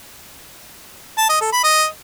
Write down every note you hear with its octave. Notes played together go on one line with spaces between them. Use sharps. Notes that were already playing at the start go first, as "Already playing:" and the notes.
A5
D#5
A4
B5
D#5